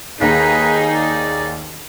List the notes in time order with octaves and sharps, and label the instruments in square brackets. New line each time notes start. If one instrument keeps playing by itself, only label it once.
[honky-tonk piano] D#2 [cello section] D#4 G#4 [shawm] B4
[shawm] D5